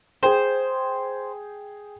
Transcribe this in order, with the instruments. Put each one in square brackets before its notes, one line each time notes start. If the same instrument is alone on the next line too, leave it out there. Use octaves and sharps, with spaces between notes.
[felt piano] G#4 G5 [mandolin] C5